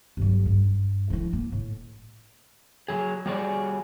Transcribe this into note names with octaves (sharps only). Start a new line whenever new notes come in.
G1 F#3
G2
F3 E4
A#3
A2
F#3 G#4
G3 F#4 G#4 C#5 D5